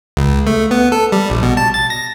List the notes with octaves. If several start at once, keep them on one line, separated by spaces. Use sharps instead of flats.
C#2
A3
B3
A4
G3
A#1
B2
A5
A6
A#6